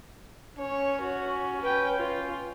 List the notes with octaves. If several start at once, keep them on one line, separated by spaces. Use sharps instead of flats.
C#4 C#5
F#4
B4 G5
F4